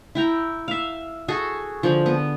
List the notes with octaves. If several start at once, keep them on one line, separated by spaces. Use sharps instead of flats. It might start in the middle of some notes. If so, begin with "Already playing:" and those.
E4 G5 A#5
E5 F5
F#4 G#4 A4
D3 F3
B3